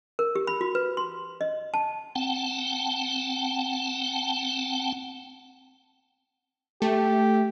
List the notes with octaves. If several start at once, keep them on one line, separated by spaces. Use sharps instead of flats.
A#4
G4
B5
F#4
B4
C6
D#5
A5
C4 F#5 G5 A5
A3 G4